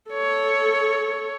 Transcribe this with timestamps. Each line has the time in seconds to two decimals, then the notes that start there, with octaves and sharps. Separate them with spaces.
0.11 A4 C#5